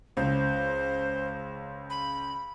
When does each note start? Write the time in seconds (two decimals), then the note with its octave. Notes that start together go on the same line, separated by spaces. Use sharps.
0.17 C#2 C#3 C5
1.90 B5